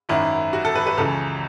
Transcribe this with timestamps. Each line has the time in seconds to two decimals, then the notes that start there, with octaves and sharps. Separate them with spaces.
0.09 G#1 F#2 D#3 E4
0.53 F#4
0.65 A4
0.75 B4
0.87 B4
0.97 C#2 C#3 E3 A4